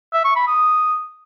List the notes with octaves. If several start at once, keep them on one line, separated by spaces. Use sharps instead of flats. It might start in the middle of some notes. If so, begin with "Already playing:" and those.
E5
C#6
B5
D#6